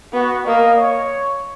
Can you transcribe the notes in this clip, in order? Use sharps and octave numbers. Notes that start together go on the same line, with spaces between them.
B3 F#4
A#3 D#5
C#5